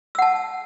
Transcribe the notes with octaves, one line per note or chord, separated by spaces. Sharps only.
F#5 A5 E6